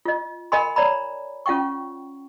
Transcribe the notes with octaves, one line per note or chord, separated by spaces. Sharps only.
F4 D#5
A#4 D#5 F#5 G#5 B5 C6
C#5 D5 A#5 B5
C#4 F4 F#5 G5 C#6